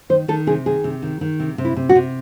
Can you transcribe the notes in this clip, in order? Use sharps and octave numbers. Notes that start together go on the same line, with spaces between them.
D#3 C5
D#3 A4
C3 G#4
D#3 G#4
C3
D#3
D#3
C3
C3
E4
C3
F#4
C3